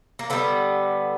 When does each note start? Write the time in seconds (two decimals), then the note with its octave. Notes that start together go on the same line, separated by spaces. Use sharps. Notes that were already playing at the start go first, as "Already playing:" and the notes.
0.19 A#3
0.30 D3 G3 B3